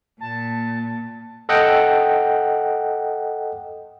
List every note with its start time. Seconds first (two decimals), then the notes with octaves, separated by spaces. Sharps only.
0.21 A#2 A5
1.49 A4 D#5 F#5 G5